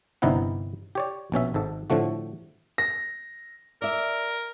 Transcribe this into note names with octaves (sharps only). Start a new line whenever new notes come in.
G1 G2 C3 D#4 E4 F#5
G4 C#5 D5
A#1 B2 C#4 E5
G#1 G#2 A4
A2 D3 F3 A3 F#4
A#6
A#4 D5 E5